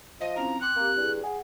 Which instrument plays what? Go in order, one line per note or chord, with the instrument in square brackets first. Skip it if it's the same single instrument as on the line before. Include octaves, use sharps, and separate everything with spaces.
[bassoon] F3 [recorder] D#5
[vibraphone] C4 C#4 E4 [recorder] A#5
[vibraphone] G5 C6 D6 [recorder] F#6
[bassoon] A#3 [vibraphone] C4 G4
[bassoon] G2 [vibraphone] E4 G#4
[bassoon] G#4 [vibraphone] F#5